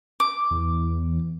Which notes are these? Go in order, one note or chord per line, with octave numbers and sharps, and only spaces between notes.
D6
E2